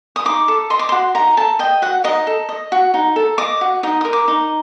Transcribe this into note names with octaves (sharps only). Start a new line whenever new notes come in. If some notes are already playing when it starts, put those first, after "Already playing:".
D#6
D#4 D6
A4
D#5 C6
D6
F#4 C6
D#4 A#5
A4 A5
D#5 G5
F#4 F#5
D#4 D#5
A4
D#5
F#4
D#4
A4
D#5 D6
F#4
D#4 D#6
A#4 D#6
D6
D#4